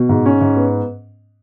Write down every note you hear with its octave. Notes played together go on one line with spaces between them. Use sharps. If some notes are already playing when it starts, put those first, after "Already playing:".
Already playing: B2
G#2
C#4
G#2
B3